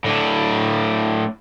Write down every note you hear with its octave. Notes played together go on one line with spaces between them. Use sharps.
A2 D4